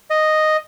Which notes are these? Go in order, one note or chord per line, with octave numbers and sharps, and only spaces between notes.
D#5